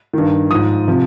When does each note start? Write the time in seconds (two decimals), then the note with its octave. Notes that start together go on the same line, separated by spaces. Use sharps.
0.13 G2 D#3
0.51 G#2 F3 D#6
0.87 C3 F3